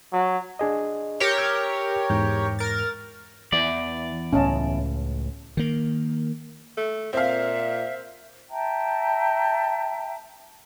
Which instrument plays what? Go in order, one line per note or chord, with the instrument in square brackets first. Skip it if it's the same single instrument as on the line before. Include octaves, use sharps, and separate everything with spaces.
[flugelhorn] F#3
[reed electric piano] D4 G#4 D#5
[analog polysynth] G4 A#4 C#5
[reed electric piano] E6 F6 G6
E2 G#2 G6
[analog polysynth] A#4 A6
[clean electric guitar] E2 D5 [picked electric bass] E3
[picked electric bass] C#2 A2 [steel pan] C#4 D#5 A5
[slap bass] D#3 A#3
[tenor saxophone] A3
[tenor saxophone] A#2 [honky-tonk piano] C4 F5 [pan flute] E5
[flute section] E5 G5 A5 A#5